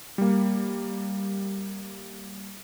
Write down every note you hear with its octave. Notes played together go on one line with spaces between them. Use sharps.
G3 A#3